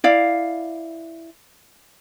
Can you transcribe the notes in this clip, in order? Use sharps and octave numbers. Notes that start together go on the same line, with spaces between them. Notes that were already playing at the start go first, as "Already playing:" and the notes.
E4 D5 F5